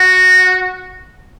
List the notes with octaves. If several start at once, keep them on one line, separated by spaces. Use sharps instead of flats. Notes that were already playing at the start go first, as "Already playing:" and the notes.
Already playing: F#4